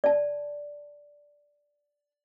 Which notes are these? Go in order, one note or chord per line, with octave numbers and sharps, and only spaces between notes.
D5 A5